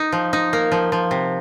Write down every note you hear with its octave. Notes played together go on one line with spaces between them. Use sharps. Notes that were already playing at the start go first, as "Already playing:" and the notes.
Already playing: D#4
F3
D#4
A#3
F3
F3
C3